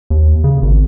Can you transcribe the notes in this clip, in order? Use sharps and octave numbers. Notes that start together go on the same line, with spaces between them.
D#2
C#3
G#1